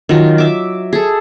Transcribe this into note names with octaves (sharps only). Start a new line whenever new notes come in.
D#3 F#3 F4
E5 D6
G#4 A4